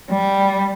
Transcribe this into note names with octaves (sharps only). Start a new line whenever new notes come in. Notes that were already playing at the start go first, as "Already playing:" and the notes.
G3